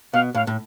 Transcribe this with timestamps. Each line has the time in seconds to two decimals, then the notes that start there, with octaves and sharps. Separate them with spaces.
0.13 B2 F5
0.35 A2 F5
0.47 A2